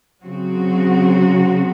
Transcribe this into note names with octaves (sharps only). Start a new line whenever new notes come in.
C#3 F#3 C4 F#4